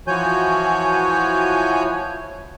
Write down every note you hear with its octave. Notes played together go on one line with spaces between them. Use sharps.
E3 F3 F#4 C#5 G#5 G6